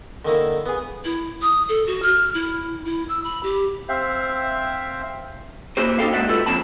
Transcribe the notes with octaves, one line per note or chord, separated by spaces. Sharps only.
D3 D#3 A#3 E4
B3 G#4
E4
D#6
A4
F#4
F6
E4
E4
E6
B5
G4
C4 C5 E5 F5
A#3 E4 F#4 G4 C5
A#3 D4 D#4 G4 A4 F5
G#3 A#3 F#4 D5 E5 F#5
G3 G#3 B3 E4 F4 A4
A#2 D3 F3 C4 A5 B5